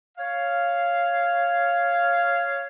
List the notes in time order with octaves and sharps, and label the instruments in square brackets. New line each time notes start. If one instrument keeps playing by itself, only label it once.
[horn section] C#5 F5